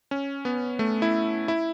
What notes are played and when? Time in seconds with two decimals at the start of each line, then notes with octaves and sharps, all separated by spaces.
0.11 C#4
0.45 B3
0.79 A3
1.02 E4
1.48 E4